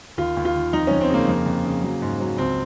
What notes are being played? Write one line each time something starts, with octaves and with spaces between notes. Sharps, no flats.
D#2 F4
D#2
F4
D#3
F2 D#4
F2 C#4
C4
C#3 A#3
F2
F2
C#3
F#3
G#2
F#3
C#2 C4